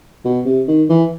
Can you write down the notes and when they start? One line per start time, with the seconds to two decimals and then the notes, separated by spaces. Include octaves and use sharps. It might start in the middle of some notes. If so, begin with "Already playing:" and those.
0.25 B2
0.45 C3
0.68 D#3
0.89 E3